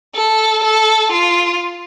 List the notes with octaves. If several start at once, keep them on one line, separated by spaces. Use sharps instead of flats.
A4
A4
F4